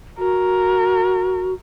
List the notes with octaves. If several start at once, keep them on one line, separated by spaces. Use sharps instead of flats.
F#4 A#4